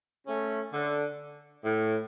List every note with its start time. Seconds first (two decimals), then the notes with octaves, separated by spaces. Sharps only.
0.27 A3 C#4
0.73 D3
1.65 A2